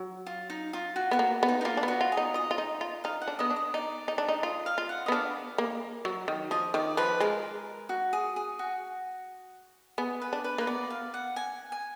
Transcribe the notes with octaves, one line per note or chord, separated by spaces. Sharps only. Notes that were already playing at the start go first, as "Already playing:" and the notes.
Already playing: F#3
F4
D#4
F4
F#4
B3 F#4
A#3
B3
D#4
D#4
A#3 F4
D4
B3 F#4
F4
G#4
D#4
F4 D#5
F4
D#4
F4
D#4 F5
F#5
D4
B3 D#5
D4
D#5
D#4 D5
D#4
D4
D#4
F4 D#5
F5
F4
F#5
B3 D#5
D4 F5
A#3
F#3
D#3
F3 D#5
D#3 D5
F3 B4
G#3 A#4
F#4
G#4
G#4
F#4
B3 G#4
B4
D4
B4
A#3 B4
B3 D5
F5
F#5
G#5
G#5